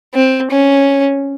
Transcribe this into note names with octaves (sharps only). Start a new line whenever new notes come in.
C4
C#4